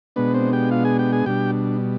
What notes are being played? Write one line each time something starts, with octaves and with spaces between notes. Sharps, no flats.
B2 G#3 B3 D4 B4
C4 C5
G4 G5
F4 F5
G#4 G#5
G4 G5
G#4 G#5
B2 G3 D4 G4 G5